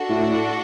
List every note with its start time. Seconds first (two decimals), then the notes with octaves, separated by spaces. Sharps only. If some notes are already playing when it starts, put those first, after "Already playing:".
Already playing: D4 F#4 A4
0.09 A2